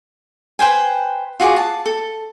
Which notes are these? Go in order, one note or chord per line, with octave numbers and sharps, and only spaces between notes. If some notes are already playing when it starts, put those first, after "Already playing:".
B4 C5 G5 G#5
F4 F#4 G#4 D6
A5
A4